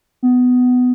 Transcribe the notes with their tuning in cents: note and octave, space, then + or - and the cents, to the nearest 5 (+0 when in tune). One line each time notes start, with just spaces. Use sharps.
B3 +15